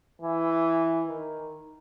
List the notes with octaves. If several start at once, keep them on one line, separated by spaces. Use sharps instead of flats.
E3
D#3